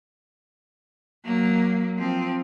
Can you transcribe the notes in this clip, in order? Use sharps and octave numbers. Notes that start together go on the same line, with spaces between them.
F#3 A#3
F3 C4